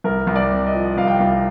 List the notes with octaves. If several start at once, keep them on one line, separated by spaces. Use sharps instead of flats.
C2 A#4
C2
D5
C3
D#5
F3
C2 F5
G5
C2 F5